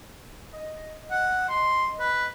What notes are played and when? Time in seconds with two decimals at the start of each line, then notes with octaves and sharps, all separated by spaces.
0.53 D#5
1.11 F#5
1.49 C6
2.00 B4